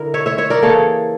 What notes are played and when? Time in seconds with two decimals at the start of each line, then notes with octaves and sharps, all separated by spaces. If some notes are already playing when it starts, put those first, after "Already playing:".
Already playing: D3 E4 A#4
0.14 C#5 E5
0.26 C#5 E5
0.38 C#5 E5
0.50 A#4 D5
0.62 C#3 E3 A#3 A4 C#5